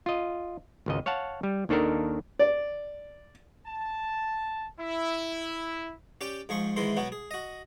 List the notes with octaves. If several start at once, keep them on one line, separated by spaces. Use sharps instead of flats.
F4 D#5
G#1 C#2 D#5
C#5 F5 F#5 A5
G3
D#2 D#3 D4 A4 A#4
D5
A5
E4
C#4 G4 D5 G5
G#2 F3 G#4 C#6
G#2 D#3 E3 G#3 E4 C6
B2 F#3 B3 F#4
G#4
F#4 D#5